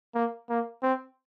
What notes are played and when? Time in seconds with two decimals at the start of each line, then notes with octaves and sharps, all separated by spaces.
0.15 A#3
0.50 A#3
0.83 C4